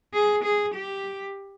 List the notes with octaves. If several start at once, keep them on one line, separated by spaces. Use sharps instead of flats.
G#4
G#4
G4